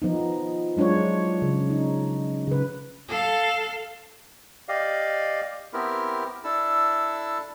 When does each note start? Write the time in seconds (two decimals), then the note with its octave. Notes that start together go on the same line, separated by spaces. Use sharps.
0.02 F3 B3 D#4
0.77 F#3 G#3 D4 F4 C#5
1.42 C#3
1.70 D#4
2.47 C#3 B4
3.09 A4 F5
4.69 G4 D5 D#5 F5
5.73 B3 C4 E4 G4 A#4
6.44 D4 E4 A4 E6